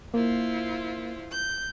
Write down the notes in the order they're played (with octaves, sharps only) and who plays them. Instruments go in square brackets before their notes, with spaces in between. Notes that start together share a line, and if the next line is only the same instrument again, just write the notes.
[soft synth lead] A#3 [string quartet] E4 F4 C5
[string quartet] G6